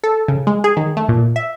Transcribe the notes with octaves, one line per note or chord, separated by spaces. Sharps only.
A4
C#3
G#3
G#4
D#3
A3
A#2
E5